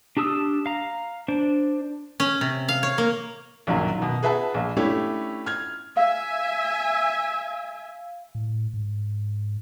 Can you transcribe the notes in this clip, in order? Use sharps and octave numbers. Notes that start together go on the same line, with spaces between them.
D4 G4 A5 D#6 E6
F5 A#5
D4 C5
C#4
C3
F5
C#5
A#3
A#1 F#2 D#3 F#3
B2 D#3
G#4 B4 E5 F#5 A5
A#1
A3 C#4 D4 E4 G4
F6 G#6
E5 F5 G#5
A2
G#2